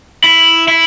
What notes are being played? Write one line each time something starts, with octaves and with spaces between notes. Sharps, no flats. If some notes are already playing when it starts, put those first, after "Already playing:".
E4
E4